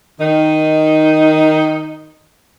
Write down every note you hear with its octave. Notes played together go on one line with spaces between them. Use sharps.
D#3 D#4